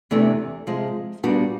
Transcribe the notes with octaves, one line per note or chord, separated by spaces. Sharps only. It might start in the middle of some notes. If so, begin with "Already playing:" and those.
E2 C3 E3 A3 D4
C3 F3 G#3
A#2 G3 B3 D4 F#4